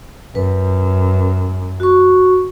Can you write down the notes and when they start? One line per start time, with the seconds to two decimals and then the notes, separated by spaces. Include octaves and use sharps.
0.35 F#2 B4
1.80 F#4 C#6